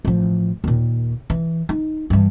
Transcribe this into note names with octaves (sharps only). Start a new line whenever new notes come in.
A1 F3
D#2 A#2
E3
D#4
G2 E3